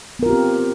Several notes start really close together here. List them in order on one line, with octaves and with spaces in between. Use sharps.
B3 A#4 F4 G4 C4